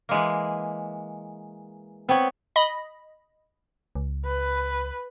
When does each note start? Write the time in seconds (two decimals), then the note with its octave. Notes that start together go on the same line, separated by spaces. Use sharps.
0.09 E3 G#3 A#3
2.09 B3 C4 C#5 G5 B5
2.56 D#5 B5
3.95 C#2
4.26 B4